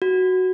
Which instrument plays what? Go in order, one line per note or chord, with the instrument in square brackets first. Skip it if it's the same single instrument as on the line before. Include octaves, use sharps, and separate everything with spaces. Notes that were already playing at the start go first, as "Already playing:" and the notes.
[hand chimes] F#4